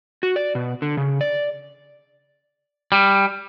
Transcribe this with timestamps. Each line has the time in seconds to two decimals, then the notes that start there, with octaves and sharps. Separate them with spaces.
0.23 F#4
0.36 D5
0.55 B2
0.82 D3
0.97 C#3
1.21 D5
2.92 G3